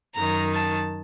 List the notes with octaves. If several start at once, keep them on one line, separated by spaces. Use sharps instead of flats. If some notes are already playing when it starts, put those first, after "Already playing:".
F#2 D#3 A#5
A5